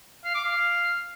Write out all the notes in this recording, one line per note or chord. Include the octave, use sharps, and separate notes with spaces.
F5
D6
F5